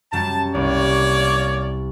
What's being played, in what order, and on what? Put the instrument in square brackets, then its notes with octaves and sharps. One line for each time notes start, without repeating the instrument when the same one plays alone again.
[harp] F#2 F#3 G3 [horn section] A5
[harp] C2 [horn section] A#3 C#5 D5